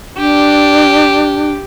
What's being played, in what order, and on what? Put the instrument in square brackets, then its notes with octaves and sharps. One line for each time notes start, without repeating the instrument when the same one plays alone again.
[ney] D4 [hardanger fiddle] G4